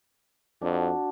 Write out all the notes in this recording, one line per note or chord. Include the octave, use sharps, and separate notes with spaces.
F2 D4 F#4